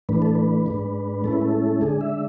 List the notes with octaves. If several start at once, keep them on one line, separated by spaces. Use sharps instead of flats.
A2 E3 A3 D4 B4
A4
B4
G#2 G#3 D4
A2 G#3 C#4 E4 A4
B4
A4
D3 G#3 D4 G#4
E5